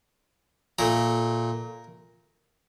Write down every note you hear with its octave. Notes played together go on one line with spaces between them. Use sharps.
A#2 A3 A#4